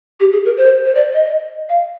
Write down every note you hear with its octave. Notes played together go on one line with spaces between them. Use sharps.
G4
G#4
A#4
C5
C5
D5
D#5
F5